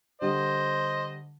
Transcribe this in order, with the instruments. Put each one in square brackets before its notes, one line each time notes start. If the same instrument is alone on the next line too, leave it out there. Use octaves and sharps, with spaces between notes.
[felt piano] D3 G3 [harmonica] C5 D#5